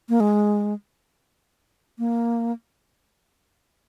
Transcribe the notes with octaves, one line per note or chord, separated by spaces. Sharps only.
A#3
G#3
A#3